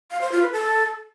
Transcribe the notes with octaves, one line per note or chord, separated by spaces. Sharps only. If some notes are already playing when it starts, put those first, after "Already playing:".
F5
C5
F4
B4
A4